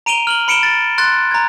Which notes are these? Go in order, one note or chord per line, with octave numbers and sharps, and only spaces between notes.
A#5 D7 D#7 F7 G7
F6 F#7 G7
B5 C#7 D7 E7 G7
A6
C6 F#6 A6
A#5 G#6